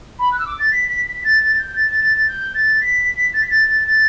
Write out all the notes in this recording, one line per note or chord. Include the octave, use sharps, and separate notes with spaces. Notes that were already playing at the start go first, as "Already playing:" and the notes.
B5
F#6
E6
D6
A6
B6
B6
B6
A6
A6
A6
G6
A6
A6
A6
A6
G6
A6
B6
A6
B6
A6
A6
A6